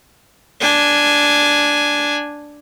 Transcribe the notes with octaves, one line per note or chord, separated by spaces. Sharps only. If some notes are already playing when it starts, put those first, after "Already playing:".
D4 G#5